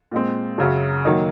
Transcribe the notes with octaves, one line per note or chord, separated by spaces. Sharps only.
A#2 G#3 C4
F#2 C#3 F#3 C#4
D#3 F#3 A#3 D#4